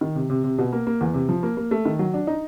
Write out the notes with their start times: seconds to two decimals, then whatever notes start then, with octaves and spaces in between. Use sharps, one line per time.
0.01 D#3
0.15 C3
0.30 C3
0.44 C3
0.58 B2
0.73 A#3
0.87 A#3
1.01 E2
1.14 C3
1.29 F3
1.43 A#3
1.57 A#3
1.71 A3
1.85 D#3
1.99 F#3
2.14 D4
2.27 D#4